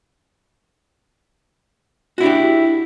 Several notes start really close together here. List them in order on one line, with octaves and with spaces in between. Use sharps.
F#4 E4 D4 G4